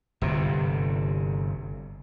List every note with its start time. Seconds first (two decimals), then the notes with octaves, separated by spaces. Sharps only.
0.22 G1 C3